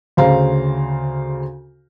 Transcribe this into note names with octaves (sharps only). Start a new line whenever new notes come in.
D2 C#3 C5 F5 A#5